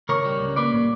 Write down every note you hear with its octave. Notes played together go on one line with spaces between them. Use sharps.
C#2 A#4 C#5
G3
C#2
A#3 B4 D5
A#2